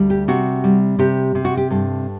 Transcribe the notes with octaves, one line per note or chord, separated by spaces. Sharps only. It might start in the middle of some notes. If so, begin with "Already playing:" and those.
Already playing: D2 G3
G4
C3 F#4
G3
C3 G4
C3
F#4
G4
G2 A4